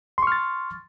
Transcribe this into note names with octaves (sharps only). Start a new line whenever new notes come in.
C6 C#6 F6 A6